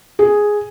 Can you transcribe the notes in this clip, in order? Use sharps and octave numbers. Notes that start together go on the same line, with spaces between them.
G#4